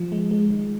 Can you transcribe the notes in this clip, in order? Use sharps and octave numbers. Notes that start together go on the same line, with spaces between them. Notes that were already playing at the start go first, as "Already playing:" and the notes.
Already playing: F3
G#3
G#3
D#3